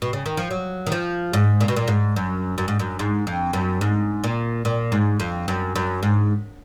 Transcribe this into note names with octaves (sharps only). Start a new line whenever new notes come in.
B2
C#3
D#3
F3
F#3
D#3
F3
G#2
A#2
B2
A#2
G#2
F#2
F#2
G#2
F#2
G#2
F2
F#2
G#2
A#2
A#2
G#2
F2
F#2
F#2
G#2